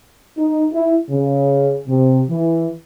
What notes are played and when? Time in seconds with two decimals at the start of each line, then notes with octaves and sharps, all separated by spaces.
0.37 D#4
0.72 E4
1.09 C#3
1.87 C3
2.29 E3